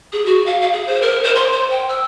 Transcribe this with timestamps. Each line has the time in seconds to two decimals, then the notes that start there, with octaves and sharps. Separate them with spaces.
0.12 G#4
0.26 F#4
0.46 F5
0.61 F5
0.73 G#4
0.87 C5
1.02 A#4
1.24 C5
1.35 C6
1.52 C5
1.70 G5
1.89 E6